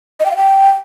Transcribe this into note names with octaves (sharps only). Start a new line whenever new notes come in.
D#5
G5
F5
G5